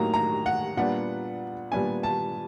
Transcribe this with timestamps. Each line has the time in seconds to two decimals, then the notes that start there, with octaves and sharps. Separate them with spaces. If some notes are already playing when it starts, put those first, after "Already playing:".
Already playing: A2 F#3 A#3 D#4 A#5
0.14 A#5
0.46 F#5
0.77 A#2 G3 B3 D4 F#5
1.72 A#2 G3 B3 D4 G#5
2.03 A5